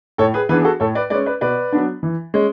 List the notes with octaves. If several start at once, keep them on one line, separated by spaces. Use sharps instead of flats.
A2 A4 C#5
G#4 B4
E3 B3 D4 G#4 B4
G#4
F#4 A4
A2 A4 C#5
B4 D5
G#3 C#4 B4 D5
B4 D5
B2 B4 D5
F#3 B3 D4
E3
G#3 C#4